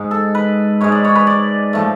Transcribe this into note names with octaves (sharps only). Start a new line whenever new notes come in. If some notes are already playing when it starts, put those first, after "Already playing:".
Already playing: G#2 G#3
A4
B4
G#2 G#3 C#5
D5
C#5
B4
D5
A2 F3 A3